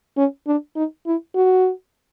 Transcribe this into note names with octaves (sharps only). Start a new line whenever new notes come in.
C#4
D4
D#4
E4
F#4